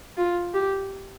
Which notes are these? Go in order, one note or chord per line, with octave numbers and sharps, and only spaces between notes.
F4
G4